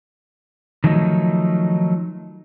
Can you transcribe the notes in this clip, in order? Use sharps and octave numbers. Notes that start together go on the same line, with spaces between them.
D#3 F3 F#3 A3 D#4